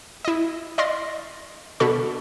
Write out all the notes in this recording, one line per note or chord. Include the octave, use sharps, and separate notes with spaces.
E4 D#5
D5 D#5 F5 C6 A#6
B2 D3 A4 B5 C#6